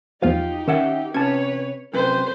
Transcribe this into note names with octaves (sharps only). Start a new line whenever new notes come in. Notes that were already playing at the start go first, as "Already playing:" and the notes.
E2 F3 D#4 F4 G4 F5
D#3 C#4 E5 F#5
C3 C#4 B4 C#5 A5 G#6
F#2 C3 B4 C5